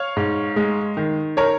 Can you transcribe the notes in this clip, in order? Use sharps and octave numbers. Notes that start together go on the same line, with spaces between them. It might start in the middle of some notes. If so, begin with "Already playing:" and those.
Already playing: C#5 F5
G#2
G#3
D#3
A#4 C#5